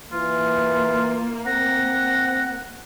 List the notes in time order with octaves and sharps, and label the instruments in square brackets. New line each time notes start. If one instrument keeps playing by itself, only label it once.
[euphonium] E3 [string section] A#3 [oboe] F4
[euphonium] C4 [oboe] F#5 [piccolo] A#6